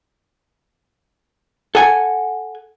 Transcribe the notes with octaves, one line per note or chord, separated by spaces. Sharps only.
A4 F#5 G#5